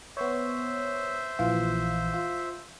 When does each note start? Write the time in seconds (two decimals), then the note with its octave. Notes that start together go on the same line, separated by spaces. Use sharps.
0.17 B3 C5 C#5 E5
1.39 A#1 E3 F4
2.14 F4